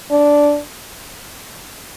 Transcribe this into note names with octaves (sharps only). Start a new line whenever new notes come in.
D4